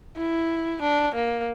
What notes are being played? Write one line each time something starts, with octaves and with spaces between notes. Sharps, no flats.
E4
D4
A#3